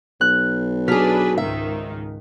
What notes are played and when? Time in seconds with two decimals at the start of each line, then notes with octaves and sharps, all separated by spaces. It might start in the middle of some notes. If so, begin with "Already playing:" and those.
0.21 B1 F#6
0.88 F#3 D4 G#4 B4 F6 B6
1.38 C#2 G#2 D#3 E5